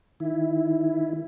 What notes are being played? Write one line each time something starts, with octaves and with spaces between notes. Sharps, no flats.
D#3 E4